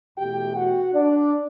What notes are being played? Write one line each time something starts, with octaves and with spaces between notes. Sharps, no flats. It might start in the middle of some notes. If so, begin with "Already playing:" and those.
E2 B2 A3 G4 G5
F#4 F#5
D4 D5